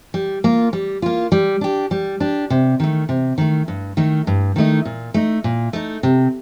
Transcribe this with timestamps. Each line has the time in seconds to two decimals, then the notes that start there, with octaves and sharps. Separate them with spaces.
0.14 G3
0.44 A#3 F4
0.73 G3
1.02 A#3 F4
1.32 G3
1.61 D4 G4
1.91 G3
2.20 D4 G4
2.50 C3
2.80 D#3 A3
3.09 C3
3.38 D#3 A3
3.68 G2
3.97 D#3 A3 D#4
4.27 G2
4.56 D#3 A3 D#4
4.85 A#2
5.14 A3 D#4
5.44 A#2
5.73 A3 D#4
6.03 C3